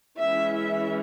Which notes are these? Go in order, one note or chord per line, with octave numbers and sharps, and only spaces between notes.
E3 G#3 C#4 E5
E5